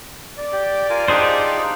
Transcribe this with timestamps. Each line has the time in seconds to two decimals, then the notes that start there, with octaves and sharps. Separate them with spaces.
0.37 D5
0.53 G4
0.90 F4 A#4 G#5
1.08 D4 D#4 F4 G4 G#4 C5